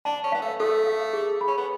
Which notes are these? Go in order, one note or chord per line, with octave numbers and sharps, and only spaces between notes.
D4 A5
C#4
B3 F5
A3
A3 A4
F5
G#4
B5
C#4
B3